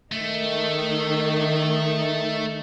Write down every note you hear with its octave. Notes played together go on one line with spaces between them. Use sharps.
D#3 A3 D#4